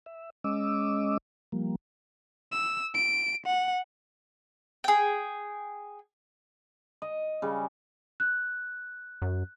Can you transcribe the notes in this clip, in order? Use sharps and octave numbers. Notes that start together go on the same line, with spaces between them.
E5
G#3 C#4 D#5 D6 E6
F3 G3 A#3
E6
D7
F#5
G#4 G5
D#5
C#3 G3
F#6
F#2